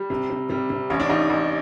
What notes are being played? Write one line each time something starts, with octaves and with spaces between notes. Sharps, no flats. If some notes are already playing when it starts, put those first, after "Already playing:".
Already playing: G3
C3
C3
C3 G3
C3
A1 C#4
D4
A1 D#4
A1